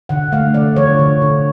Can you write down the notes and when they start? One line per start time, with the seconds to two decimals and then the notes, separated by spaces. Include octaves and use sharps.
0.09 D3 F#5
0.32 A3 F5
0.54 D3 D5
0.76 F3 C#5
0.99 D3
1.22 D3